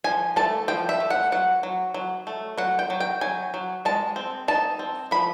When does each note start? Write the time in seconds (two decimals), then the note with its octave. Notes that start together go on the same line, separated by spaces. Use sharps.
0.04 F3 G#5
0.36 A3 A5
0.68 F3 G5
0.89 E5
1.00 A3
1.10 F#5
1.32 F#3 F#5
1.63 F#3
1.94 F#3
2.27 A3
2.58 F#3 F#5
2.79 G5
2.90 F#3
3.00 G5
3.21 F#3 G#5
3.54 F#3
3.85 G#3 A5
4.16 C4
4.48 D#4 A5
4.79 C4
5.11 F3 B5